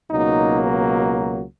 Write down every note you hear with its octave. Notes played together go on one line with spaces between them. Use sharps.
C#2 B2 F#3 A#3 D#4